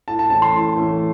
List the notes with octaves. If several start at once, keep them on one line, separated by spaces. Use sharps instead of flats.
A2 A5
A5
E3 A3 C#4 A5
C6
A2
E3 A3 C#4